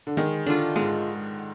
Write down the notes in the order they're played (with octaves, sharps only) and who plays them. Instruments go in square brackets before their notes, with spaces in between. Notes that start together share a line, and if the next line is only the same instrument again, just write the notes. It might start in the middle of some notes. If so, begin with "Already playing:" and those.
[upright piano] D3
[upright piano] D#3 [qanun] G#3
[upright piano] D3 [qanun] D4 F4
[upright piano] G#2 [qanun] G#3